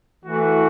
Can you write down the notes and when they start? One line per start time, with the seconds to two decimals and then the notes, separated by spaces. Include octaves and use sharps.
0.24 E3 A3 F#4